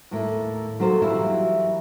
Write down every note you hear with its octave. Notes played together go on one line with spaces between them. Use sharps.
D#2 A2 A#3
D#3 F#3 A#3 A4 C5
E3 F#3 G3 A#3 E4 F#4